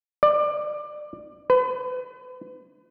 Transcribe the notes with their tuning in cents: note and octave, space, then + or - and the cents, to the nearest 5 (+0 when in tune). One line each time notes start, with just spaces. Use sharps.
D5 +20
B4 +35